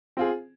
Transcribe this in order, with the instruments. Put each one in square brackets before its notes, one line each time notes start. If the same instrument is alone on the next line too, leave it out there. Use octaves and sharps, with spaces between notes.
[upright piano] C4 F4 G#4